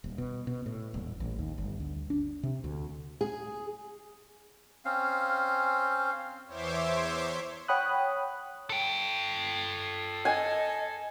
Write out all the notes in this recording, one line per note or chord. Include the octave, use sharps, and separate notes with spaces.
D#1
B2
B2
A2
D#1
A1
D#2
G1
D2
D4
C3
D2
G#4
C4 C#4 F5
E2 C5 C#5 E5 C6 D6
C#5 F#5 G5 B5 D#6 F#6
A4 G5
D#5 G#5